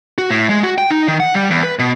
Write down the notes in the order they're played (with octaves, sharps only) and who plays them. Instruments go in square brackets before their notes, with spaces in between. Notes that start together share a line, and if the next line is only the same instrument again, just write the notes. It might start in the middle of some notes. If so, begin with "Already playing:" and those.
[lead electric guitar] F#4
A2
G#3
F#4
G5
D#4
D#3
F#5
G3
E2
B4
B2